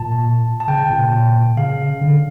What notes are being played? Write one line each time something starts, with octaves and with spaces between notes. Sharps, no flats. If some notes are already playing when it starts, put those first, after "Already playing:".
Already playing: A#2 A5
A5
C#3 G5
A#2
C#3 F5
D3